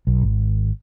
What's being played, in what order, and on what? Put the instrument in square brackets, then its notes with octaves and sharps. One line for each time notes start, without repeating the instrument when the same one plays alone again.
[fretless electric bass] B1
G#1